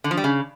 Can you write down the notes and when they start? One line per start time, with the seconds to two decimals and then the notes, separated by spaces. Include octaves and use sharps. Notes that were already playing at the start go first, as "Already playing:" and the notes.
0.04 D3
0.11 F3
0.17 G3
0.24 C#3